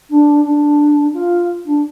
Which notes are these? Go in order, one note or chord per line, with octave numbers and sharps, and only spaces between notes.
D4
D4
F4
D4